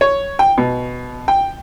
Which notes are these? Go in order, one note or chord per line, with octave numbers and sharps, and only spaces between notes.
C#5
G5
B2
G5